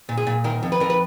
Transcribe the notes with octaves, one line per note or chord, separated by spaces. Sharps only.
A#2
G#4
A#2
D#3 A#4
F2
B4
F2 A#4
B4